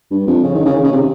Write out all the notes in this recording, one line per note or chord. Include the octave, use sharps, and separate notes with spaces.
G2
F2
C#3
D#3
C#3
D#3
C#3
C3